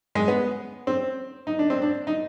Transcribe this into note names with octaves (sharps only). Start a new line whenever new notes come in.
G#3
B3
C4
D#4
D4
C4
D4
D#4